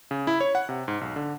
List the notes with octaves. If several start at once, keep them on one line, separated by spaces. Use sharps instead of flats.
C#3
E4
C#5
F#5
C3
G#2
B1
D3